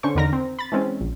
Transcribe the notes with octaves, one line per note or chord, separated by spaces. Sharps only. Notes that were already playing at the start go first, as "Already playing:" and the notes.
D3 C#4 C5 C#6
E2 D3 D#3 A#4 A#5 A#6
C4
B5 A6
E3 G#3 C4 C#4
A#1